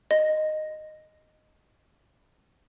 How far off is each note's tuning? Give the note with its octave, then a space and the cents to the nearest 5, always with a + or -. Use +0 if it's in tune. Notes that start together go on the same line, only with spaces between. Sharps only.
D#5 -10